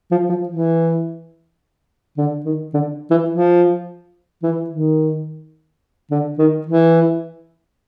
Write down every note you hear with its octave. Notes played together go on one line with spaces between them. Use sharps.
F3
F3
E3
D3
D#3
D3
E3
F3
E3
D#3
D3
D#3
E3